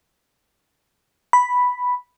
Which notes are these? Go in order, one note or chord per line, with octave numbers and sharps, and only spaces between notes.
B5